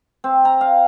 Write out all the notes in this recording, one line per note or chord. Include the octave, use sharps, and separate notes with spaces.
C4
A#5
F5